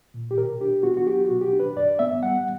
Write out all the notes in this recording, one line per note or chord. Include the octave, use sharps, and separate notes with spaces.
A#2
G4
B2 A#4
D4 G4
B3 F#4
F#4
F#3 G4
F#4
B2
G4
D4
B4
G2 D5
B3 E5
G3 F#5